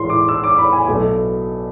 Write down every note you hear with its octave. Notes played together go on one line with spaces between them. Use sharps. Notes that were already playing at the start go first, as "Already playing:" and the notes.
Already playing: A1 A2 E3 G#3 C6
D6
E6
D6
B5
G#5
B1 B2 A3